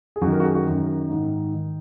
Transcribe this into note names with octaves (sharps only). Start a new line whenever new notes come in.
G#4
F#2 D#3 F#4
A#4
F#4
G#4
F#4
F#2 D#3 D#4
G#2 D#3
D#3